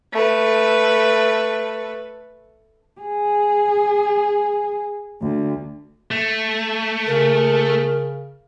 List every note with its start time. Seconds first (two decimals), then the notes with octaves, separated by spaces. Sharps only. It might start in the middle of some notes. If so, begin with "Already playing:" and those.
0.13 A3 B4
3.01 G#4
5.22 D2
6.11 A3
7.06 C#3 A#4